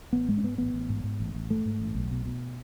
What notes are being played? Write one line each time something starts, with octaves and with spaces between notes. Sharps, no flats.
A1 B3
G#2 G#3
C#4
G#2 B3
A1 B3
A1
G#2
G#2
A1
A1
G#2 A3
G#2
A1
B1
B2
B2